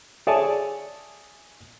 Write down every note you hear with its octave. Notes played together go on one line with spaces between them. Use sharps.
G#4 C#5 D5 E5 G#5 A5